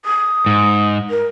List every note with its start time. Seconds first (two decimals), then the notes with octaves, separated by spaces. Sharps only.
0.05 D#6
0.46 G#2
1.10 A#4